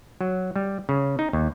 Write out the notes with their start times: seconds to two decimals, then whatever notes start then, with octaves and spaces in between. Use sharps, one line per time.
0.21 F#3
0.56 G3
0.89 C#3
1.19 D#4
1.33 D#2